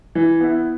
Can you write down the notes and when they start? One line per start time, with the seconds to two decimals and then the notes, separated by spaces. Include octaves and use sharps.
0.15 E3
0.40 B3 E4